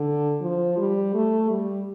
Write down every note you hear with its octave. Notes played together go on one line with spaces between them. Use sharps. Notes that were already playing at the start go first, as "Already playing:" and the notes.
Already playing: D3
F3
G3
A3
G3